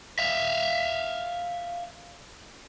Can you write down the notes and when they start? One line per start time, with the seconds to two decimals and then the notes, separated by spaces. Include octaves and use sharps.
0.19 E5 F5